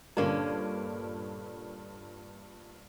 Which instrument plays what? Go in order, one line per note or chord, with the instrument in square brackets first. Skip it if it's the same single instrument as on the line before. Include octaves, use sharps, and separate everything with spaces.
[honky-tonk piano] G2 A#2 [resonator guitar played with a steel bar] D3 A#3 C#4